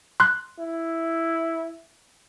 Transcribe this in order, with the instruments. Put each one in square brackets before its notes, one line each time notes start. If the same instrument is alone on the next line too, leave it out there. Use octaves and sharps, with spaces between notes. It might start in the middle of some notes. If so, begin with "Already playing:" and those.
[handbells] C6 F#6
[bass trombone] E4